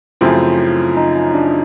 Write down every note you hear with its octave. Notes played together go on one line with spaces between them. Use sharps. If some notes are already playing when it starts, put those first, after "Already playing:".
F#2 C#3 F3 A3 C4 E4
D#4
D4